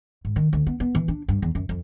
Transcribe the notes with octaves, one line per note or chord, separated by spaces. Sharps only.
G#2
D#3
D2
B3
B3
E3
D4
G2
E2
F#2
F2